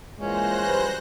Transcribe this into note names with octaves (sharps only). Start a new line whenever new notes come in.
A#2 E3 G#3 C#4 C5 F#6 A#6
E3 F#3 G3 B4